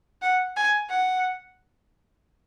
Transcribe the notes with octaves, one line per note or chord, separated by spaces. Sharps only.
F#5
G#5
F#5